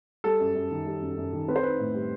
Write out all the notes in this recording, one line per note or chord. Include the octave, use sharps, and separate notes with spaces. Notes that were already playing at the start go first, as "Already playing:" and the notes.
G3 A4
F#2
F#2
D#3
G3
F#2
F#2
D#3
C4 B4
C5
D#4 B4
A2
G3